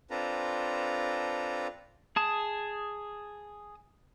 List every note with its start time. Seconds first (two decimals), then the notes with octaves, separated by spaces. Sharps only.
0.10 C4 D4 F4 A4 B4 A#5
2.16 G#4 A5 D#6